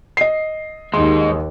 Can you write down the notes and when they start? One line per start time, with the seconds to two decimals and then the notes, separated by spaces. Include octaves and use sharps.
0.17 D#5 C7
0.94 D#2 G#3 D#4 C6